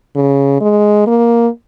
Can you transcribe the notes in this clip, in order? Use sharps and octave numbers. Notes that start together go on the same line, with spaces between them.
C#3
G#3
A#3